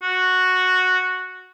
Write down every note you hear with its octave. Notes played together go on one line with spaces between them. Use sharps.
F#4